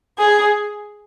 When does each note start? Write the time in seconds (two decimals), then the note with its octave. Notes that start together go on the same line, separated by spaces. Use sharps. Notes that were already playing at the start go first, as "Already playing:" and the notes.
0.19 G#4